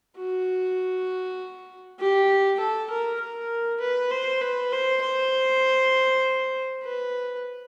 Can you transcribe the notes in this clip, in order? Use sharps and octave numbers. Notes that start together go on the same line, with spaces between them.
F#4
G4
A4
A#4
A#4
B4
C5
B4
C5
C5
B4